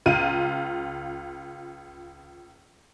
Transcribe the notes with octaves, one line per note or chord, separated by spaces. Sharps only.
C#2 F4 D#7